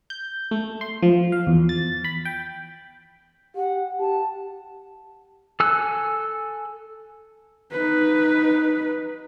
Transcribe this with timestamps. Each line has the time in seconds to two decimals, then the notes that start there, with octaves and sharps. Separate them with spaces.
0.10 G6
0.51 A3
0.81 C6
1.03 F3
1.32 F5
1.47 E2
1.69 A6
2.04 B5
2.25 G5
3.56 G4 F#5
3.99 G4 A5
5.60 A4 G#5 E6 F#6
7.72 D#4 B4